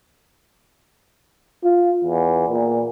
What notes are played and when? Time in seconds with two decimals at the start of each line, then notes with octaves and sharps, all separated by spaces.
1.64 F4
2.04 E2
2.49 A#2